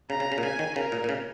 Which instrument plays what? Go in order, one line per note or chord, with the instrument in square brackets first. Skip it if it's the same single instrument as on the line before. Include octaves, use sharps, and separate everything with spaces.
[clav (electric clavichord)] C#3 [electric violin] A#5
[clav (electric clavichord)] C#3
C#3
A#2
[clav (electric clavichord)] C#3 [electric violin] G#5
[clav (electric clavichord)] D#3
[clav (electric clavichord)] C#3 [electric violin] A#4
[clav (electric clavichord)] A#2
A#2
C#3